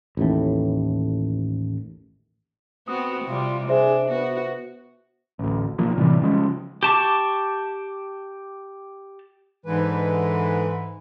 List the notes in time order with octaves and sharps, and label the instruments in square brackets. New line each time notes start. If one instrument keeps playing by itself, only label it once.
[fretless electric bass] A1 D#2 A2
[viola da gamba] B3 C4 F#4 [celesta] D#6
[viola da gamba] C3 G3 [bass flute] F4
[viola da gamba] D4 [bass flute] G#4 [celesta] C5 E5
[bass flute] B3 [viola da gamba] F#4
[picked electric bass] A1 D2
B1 F3 A#3
A2 C3 E3 G3
C#3 F3 G#3
[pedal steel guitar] G4 A5 C#6 D6
[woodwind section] G#2 E3 [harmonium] D3 G#3 B4